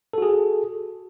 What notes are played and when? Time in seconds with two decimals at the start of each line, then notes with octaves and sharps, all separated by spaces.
0.13 A4
0.18 F#4
0.22 G#4